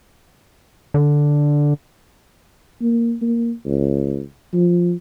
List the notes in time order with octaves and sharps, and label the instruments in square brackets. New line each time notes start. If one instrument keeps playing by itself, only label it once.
[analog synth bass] D3
[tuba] A#3
A#3
C#2
F3